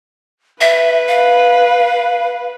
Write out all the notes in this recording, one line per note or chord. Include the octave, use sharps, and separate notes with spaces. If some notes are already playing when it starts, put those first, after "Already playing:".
B4 E5
F5